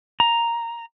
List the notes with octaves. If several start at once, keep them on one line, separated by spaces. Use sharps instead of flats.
A#5